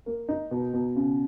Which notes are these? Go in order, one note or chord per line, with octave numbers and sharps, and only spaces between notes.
A#3
D#4
B2
B2
C#3